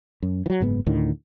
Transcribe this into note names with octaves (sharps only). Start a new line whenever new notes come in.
F#2
E3 F#3
F#1 G#2 B3
D2 A2 D3 D#3